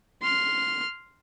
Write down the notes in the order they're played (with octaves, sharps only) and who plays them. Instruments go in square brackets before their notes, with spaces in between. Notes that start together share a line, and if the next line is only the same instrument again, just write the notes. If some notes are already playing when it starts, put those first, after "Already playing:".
[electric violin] C6 F6